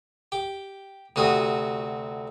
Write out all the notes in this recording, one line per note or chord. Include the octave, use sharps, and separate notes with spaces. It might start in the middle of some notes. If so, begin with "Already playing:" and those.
G4
D2 C3 F#4 D#6